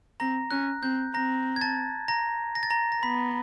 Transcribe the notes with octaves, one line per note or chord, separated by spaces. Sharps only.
C4 A#5 A#6
C#4 F#6
C4 G6
C4 A#5 A#6
G#6
A5 A6
A#5 A#6
A#6
A6
A#5 A#6
A#6
B3 B5 B6